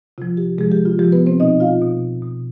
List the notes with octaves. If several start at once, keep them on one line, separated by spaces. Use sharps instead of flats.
C3 F3 F4
G4
C3 F3 G#3 G#4
G4
F4
C3 F3 G4
B3 B4
C4 C5
B2 D#4 D#5
F4 F5
B2
B2